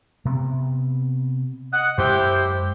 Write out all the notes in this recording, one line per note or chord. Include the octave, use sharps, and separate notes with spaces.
C3 B3
D#5 F#5
F#2 G#3 E4 G4 C5